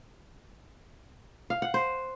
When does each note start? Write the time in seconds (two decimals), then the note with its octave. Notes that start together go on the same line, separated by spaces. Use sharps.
1.50 F5
1.62 F#5
1.74 C5